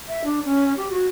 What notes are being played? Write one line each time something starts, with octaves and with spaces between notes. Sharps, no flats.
E5
D4
C#4
G4
F#4